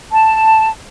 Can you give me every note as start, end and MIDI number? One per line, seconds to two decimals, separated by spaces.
0.12 0.68 81